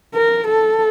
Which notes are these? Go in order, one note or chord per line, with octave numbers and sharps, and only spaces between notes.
A#4
A4